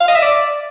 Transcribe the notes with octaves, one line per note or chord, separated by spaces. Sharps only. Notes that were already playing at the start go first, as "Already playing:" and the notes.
F5
D#5
E5
D5